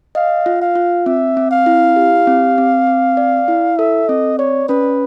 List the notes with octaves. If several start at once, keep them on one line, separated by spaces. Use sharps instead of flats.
D#5 F5
F4
F5
F4
C4 E5
C4
F5
E4
G4
C4
C4
C4
D5
E4
A4 E5
C4 D#5
C#5 D5
C#4 B4